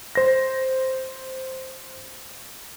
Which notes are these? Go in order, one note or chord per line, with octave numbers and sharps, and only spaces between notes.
C5 A#6